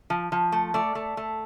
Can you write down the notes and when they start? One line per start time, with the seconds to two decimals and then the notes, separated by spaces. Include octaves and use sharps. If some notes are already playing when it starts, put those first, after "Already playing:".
0.10 F3
0.32 F3
0.52 A3
0.74 A3 D5
0.95 A3
1.17 A3